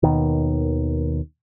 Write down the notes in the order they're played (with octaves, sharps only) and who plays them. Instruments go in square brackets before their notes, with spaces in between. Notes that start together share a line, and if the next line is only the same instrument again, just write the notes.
[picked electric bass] D#2 B2 D#3